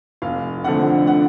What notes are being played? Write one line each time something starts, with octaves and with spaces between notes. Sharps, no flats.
F1 F5
F2 D3 F3 A3 F#5
F#5